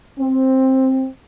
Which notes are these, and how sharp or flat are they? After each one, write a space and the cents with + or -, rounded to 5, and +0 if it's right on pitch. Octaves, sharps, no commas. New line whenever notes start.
C4 +10